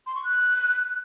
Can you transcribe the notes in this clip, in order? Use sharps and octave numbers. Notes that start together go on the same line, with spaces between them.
C6
C#6
F#6